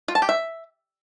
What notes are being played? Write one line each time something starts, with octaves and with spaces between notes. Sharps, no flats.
F4
A5
G4
E5